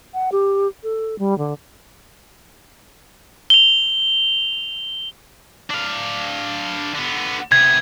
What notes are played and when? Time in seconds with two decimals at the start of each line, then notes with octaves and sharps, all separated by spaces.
0.14 F#5
0.32 G4
0.83 A4
1.19 G3
1.38 D3
3.50 F7 G7
5.70 D4 F5
6.95 D3 B3
7.52 C3 B3 G#6